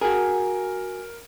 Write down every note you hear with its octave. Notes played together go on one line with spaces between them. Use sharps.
F#4 G#4 A#4